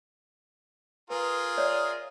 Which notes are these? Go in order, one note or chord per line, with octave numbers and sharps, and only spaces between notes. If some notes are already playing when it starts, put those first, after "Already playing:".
F4 G#4 A#4 B4
C#5 D5 E5